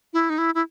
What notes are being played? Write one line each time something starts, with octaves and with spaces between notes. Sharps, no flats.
E4
D#4
E4
E4